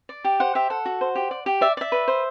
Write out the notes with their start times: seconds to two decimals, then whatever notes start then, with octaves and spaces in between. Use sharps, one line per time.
0.09 D5
0.24 G4
0.40 C5 F#5
0.55 G4 E5
0.70 A4 F#5
0.85 F#4
1.01 C5
1.15 G4
1.31 D5
1.46 G4
1.61 D5 E5
1.77 D5 E5
1.92 B4
2.08 C5